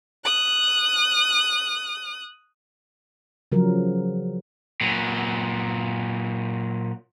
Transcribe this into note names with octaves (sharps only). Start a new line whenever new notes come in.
D#6 F#6
C#3 F3 F#3 A#4
A#2 F#3